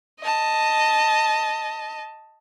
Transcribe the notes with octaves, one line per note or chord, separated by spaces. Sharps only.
D#5 A5